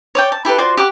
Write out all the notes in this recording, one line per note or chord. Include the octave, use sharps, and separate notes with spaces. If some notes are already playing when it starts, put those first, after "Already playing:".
C#5 D5 G5
A5
E4 G4 A4 B4
F4 F#4 C5 D5
G4 F#5 D6